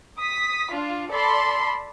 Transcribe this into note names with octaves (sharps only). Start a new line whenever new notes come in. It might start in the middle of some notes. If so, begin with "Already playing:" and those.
D#6 B6
D4 F4
A4 D5 A5 B5 C6